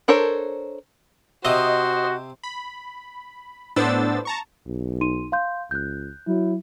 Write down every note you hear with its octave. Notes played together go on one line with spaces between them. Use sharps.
D4 A4 A#4 C5 C#5
C3 F#4 C5 D#5 E5 C6
B5
A2 B3 D4 C5 E6 A6
A5 A#5 C#6
B1
D#4 C6 D#7
F5 C6 G6
C#2 F#6 G6
F#3 E4